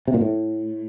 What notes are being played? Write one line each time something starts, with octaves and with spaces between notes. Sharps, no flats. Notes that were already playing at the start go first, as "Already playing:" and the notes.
C3
A#2
A2